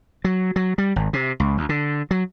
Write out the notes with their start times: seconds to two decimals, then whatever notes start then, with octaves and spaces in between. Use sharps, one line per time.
0.24 F#3
0.56 F#3
0.78 G3
0.96 G#1
1.13 C3
1.40 C#2
1.58 D2
1.69 D3
2.11 F#3